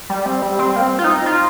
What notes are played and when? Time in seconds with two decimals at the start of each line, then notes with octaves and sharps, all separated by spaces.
0.10 G3
0.26 C4
0.42 G3
0.59 C4
0.76 A#3
0.81 C4
0.99 F4
1.04 D#4
1.26 F4